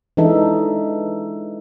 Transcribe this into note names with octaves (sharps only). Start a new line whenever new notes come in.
E3 G#3 D4 D#4 A4 E5